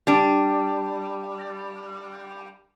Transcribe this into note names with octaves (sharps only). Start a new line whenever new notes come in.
G3 D4